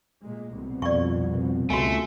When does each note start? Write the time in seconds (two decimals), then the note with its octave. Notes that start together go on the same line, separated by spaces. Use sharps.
0.24 A#2 G#3
0.52 C2 B2
0.82 F2 D5 C#6
1.70 C#2 A3 F#4 G#5